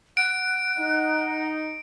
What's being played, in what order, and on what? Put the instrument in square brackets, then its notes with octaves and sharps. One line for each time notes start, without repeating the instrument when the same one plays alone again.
[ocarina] F#5 [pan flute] F#6 [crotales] D7
[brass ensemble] D#4